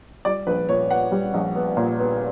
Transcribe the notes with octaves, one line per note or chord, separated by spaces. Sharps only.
G3 D5
A#1 B4
A#2 C#5
B3 F#5
G3
A#1
B3
A#2
B3